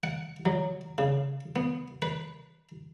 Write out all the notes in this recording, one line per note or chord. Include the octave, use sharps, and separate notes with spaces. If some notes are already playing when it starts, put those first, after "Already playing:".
F#5
F#3
C#3
B3
B4